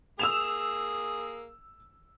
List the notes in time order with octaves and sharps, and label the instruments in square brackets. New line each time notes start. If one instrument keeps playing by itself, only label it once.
[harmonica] A#3 G#4 [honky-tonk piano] E6 E7 F7